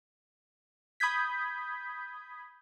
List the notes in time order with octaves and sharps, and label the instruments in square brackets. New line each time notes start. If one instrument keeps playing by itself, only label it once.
[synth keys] B5 D#6 G6 G#6 B6